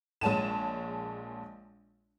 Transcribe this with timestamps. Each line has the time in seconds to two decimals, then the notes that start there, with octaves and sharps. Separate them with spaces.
0.21 A#1 G#3 C#5 A5 D#7 E7